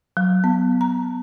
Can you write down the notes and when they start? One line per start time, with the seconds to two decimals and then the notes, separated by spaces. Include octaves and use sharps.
0.17 F#3
0.44 B3
0.81 A#5